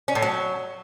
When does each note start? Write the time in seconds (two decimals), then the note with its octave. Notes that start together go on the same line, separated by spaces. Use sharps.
0.08 C#4
0.15 A2
0.22 F#3